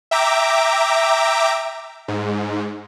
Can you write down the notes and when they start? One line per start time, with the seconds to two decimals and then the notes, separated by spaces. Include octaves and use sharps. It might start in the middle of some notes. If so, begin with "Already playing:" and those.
0.11 E5 G5 A#5 D6
2.08 G#2